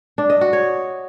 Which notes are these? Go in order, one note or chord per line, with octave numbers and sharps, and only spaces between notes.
D4
D#5
F#4
C#5